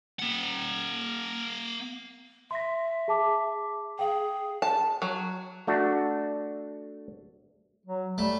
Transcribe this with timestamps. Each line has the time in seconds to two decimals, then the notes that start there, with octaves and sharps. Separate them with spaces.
0.19 A#3 F#5
2.51 E5 C6 A#6
3.08 G#4 A5 D6
3.99 G#4 F5 G5
4.62 A5
5.02 F#3
5.67 A3 D4 F#4
7.86 F#3
8.18 G3 A3